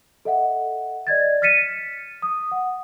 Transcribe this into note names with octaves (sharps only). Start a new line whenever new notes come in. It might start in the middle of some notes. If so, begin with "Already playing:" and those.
A4 D#5 E5 F#5
D5 D#5 G#6 A6
F6 A6 B6 C#7 D#7 E7
D#6
F#5